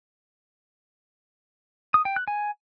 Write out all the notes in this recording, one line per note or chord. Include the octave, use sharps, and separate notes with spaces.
D#6
G5
F#6
G#5